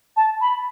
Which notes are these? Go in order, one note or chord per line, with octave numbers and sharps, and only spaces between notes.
A5
B5